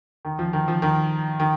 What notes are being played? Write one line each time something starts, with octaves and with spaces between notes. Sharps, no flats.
D#3
F3
D#3
F3
D#3
D#3